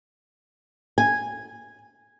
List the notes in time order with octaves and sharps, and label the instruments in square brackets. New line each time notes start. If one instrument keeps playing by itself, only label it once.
[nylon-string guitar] G#5